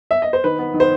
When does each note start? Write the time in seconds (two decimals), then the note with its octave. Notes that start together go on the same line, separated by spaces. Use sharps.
0.11 E5
0.22 D#5
0.33 C5
0.44 D#3 B4
0.59 B3
0.74 D#3
0.80 C5